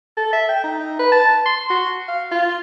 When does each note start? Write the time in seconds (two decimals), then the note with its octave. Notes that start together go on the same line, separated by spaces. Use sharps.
0.17 A4
0.33 E5
0.49 G5
0.64 D#4
0.99 B4
1.12 A5
1.46 C6
1.70 F#4
2.08 F5
2.31 F4